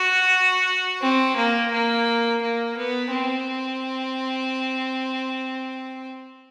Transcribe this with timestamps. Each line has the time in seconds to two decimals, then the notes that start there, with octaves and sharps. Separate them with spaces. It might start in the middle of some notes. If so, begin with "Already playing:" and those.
Already playing: F#4
1.01 C4
1.36 A#3
1.72 A#3
2.42 A#3
2.77 B3
3.12 C4